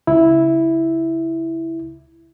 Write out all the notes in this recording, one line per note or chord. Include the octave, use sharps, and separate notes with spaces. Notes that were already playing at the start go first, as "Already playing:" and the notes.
C#2 E4